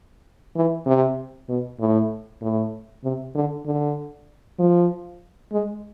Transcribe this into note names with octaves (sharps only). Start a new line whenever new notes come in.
E3
C3
B2
A2
A2
C3
D3
D3
F3
G#3